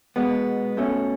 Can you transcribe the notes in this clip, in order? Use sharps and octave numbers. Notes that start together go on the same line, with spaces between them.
B2 G#3 B3
B2 A3 C#4